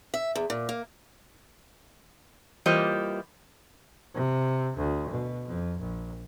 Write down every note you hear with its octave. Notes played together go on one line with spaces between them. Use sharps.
E5
E2
A#2
A#3
E3 G3 A#3 F4 C5 D#5
C3
D2
B2
F2
A#1